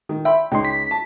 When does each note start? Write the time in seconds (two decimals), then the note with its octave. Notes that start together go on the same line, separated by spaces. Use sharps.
0.09 D#3
0.25 E5 G5 B5 C6
0.52 C#2 D#4 G5 C6
0.65 B6
0.91 A5